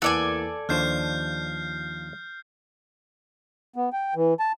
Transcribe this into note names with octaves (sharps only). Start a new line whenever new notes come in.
E2 E3 A#3 A4 D5 F#5 G#5
D#2 F3 D4 C5 F6 G6 C7
B3
G5
E3
A5